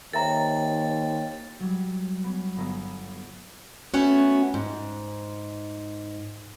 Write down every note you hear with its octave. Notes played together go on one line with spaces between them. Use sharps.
D#2 A#4 C5 C#5 E5 G5 A#5 A6
F#3 G3
B3 C#4
G1 B3 A#5 D#6 E6
A3 B3 C#4 F#4
G#2